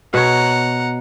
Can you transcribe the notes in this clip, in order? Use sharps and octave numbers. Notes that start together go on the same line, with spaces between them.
B2 C#5 F#5 A#5